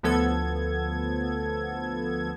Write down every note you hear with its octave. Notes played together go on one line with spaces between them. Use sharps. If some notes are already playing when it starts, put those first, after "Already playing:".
D2 F3 B3 A4 G#6